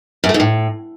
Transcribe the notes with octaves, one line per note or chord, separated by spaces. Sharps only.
F#2
A3
G#2
A2